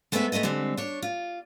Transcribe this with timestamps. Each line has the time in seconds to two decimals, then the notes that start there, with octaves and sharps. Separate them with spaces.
0.12 G#3 A3 B3 C4 B4 E5
0.32 G#3 A3 B3 C4 D#5
0.43 D3 G3 G#3 C4
0.77 D4 C#5
1.02 F4